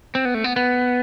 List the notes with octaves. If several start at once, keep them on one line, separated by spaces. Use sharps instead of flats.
C4
B3
A3
B3
B3